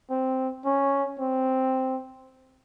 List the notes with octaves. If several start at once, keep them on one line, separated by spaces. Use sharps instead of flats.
C4
C#4
C4